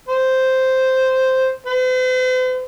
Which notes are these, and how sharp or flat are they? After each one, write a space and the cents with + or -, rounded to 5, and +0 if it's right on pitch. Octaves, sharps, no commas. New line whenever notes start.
C5 -5
C5 -45